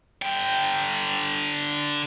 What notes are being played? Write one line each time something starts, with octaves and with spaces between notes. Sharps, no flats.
D3 G5